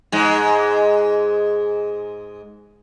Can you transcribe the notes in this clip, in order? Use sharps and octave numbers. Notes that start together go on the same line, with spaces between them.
G#2 G#3